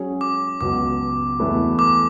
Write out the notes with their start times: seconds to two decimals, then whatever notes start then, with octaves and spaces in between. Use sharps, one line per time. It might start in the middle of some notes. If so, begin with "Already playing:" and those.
Already playing: F#3 C#4 G#4 C#5
0.21 D6
0.61 C#2 B2 F#3 D6
1.39 E2 B2 A3 E4 B4
1.79 D6